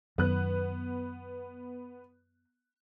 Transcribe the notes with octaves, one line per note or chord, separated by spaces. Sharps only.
F#2 D#3 B3 B4 F#6